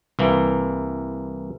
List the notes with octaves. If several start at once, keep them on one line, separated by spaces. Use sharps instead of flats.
C2 E3 A#3